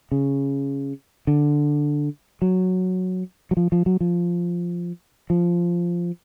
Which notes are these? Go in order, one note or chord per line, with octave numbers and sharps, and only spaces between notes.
C#3
D3
F#3
F#3
F3
F3
F#3
F3
F3